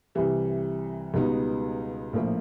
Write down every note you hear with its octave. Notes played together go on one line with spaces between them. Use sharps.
C2 C3 E3 G3
C#2 B2 G3 B3 D#4
A#1 A2 F3 A#3